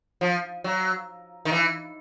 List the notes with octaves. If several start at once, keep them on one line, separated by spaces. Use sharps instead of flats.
F3
F#3
D#3
E3